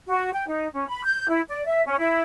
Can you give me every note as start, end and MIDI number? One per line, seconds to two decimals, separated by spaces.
0.08 0.31 66
0.34 0.45 79
0.47 0.68 63
0.73 0.86 61
0.88 1.04 83
1.04 1.26 91
1.28 1.41 64
1.49 1.64 74
1.66 1.82 76
1.86 1.99 61
1.99 2.22 64